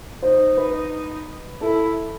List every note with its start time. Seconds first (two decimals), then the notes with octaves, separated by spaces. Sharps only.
0.23 D#4 C5
0.57 B4
1.61 E4 A4